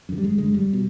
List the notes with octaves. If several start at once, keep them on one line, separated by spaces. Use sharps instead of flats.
F#2 D3
G3
G#1 G#3
F#2 D3 G#3
F1 G3
B2